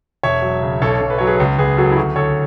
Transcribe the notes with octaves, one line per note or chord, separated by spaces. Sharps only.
E1 C#5 E5
F#3
C#3
B1 A4 C#5
B1
B4
F#3 C#5
G#4 B4
C#2
C#2 G#4 B4
F#3 F#4 A4
E4
D2 F#4
D2 A4 C#5